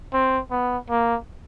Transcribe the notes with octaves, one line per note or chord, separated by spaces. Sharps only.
C4
B3
A#3